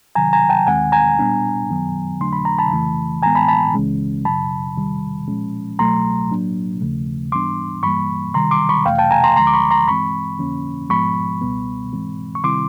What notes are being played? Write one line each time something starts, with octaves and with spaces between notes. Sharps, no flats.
C3 D#3 F#3 G#5 A#5
G#5 A#5
G5 A5
D#2 D#3 G#3 C4 F#5 G#5
G#5 A#5
A#2 G3 B3 D4
F#2 D#3 F#3 B3
F2 D3 F#3 A3 D4 C6
B5
A#5
A5 B5
F2 C#3 E3 A3
A2 E3 G#3 B3 G#5 A#5
A5 B5
A5 B5
C#2 C#3 E3 G#3 C#4
F#2 C#3 F#3 A5 B5
E2 C3 D#3 G3
A#2 F3 G#3 C#4
C2 B2 F#3 A3 A#5 C6
A2 F#3 A#3 D4
D#2 C#3 F3 A3
G#2 E3 G3 B3 D4 C6 D6
G2 E3 G3 A#3 B5 C#6
C3 D#3 G3 A#5 C6
C6 D6
B5 C#6
F2 C3 E3 A3 F5 G5
G5 A5
G#5 A#5
A#5 C6
D2 D3 F3 G#3 A#5 C6
D6
B5 C#6
A#5 C6
G2 E3 G#3 C4 B5 C#6
F2 D3 F3 A#3 C#4
G#2 F3 G#3 B3 B5 C#6
C#2 B2 G3 B3
G#2 E3 G#3 C4
C#6
C3 D#3 G3 C4 E4 C6 D6